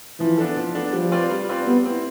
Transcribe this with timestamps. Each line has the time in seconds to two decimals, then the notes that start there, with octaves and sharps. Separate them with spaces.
0.19 E3 F3
0.38 B3 D4 A4
0.57 F3
0.75 B3 D4 A4
0.93 F3 G3
1.12 C4 F4 B4 D5
1.31 G3
1.49 C4 F4 B4 D5
1.67 G3 B3
1.85 C4 E4